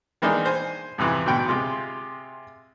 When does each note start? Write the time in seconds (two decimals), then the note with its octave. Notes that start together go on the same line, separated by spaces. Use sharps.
0.22 D#3 E3 G#3 A#3 D4 D#4
0.46 C5 G#5
0.98 F2 G#2 C3 E3
1.26 D2 G#2 B2 G5 B5
1.48 C3 G#3 F4